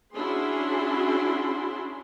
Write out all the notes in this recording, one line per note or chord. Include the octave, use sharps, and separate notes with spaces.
C#4 D4 E4 F#4 G#4 C6